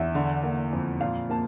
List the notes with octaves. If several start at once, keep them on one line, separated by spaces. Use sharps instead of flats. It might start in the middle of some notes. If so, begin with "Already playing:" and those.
Already playing: E2 E5
D3
A#3
F2
A#2 F5
A#3 A5